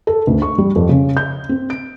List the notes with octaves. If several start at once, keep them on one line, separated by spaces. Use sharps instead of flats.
A4
D2
C#6
G3
F2
C#3
G6
C4
D7